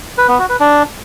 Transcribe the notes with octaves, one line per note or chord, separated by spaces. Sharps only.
B4
B3
F#4
B4
D4